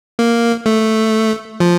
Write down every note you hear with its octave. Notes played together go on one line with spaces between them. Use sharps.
A#3
A3
F3